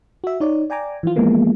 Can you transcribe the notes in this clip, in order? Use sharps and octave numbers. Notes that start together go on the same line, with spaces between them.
F#4 E5
D#4 C#5 D5
D5 G5 G#5 A#5 D6
E3 F3 F4
E3 F3 G#3 A#3 B3